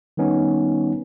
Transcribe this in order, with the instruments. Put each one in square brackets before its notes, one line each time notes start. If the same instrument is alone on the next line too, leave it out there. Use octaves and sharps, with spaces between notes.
[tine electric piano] D#3 G3 B3 C#4 D#4